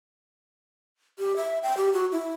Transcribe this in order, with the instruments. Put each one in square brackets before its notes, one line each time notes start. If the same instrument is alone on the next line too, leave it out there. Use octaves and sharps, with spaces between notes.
[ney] G4
E5
G5
G4
F#4
E4